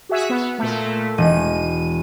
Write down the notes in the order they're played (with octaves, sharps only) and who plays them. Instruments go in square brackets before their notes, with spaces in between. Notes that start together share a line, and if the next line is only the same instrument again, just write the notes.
[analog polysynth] F#4 G#4 E5
B3
A#2 A3
[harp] E1 [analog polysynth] D#7